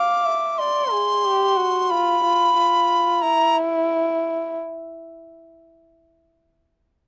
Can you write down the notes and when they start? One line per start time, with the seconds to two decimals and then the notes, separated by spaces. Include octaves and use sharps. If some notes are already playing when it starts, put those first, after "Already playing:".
Already playing: F5 D6
0.25 E5
0.58 D5 C6
0.92 G#4
1.24 G4
1.57 F#4
1.90 F4 B5
2.24 F4
2.57 F4
3.22 E4 A#5